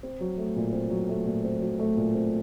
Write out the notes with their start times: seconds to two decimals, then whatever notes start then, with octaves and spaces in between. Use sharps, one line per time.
0.03 C4
0.21 F#3
0.38 A3
0.56 A#2
0.73 C4
0.90 F#3
1.09 A3
1.26 A#2
1.44 C4
1.61 F#3
1.79 A3
1.97 A#2
2.15 C4